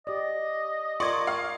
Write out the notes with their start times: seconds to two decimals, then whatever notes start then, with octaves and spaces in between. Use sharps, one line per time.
0.07 G4 D5 D#5
1.00 F4 A#4 D5 C6 C#6 D#6 G#6
1.27 F5